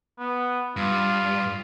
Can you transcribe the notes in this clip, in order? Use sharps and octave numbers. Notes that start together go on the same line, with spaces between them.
B3
G2 F4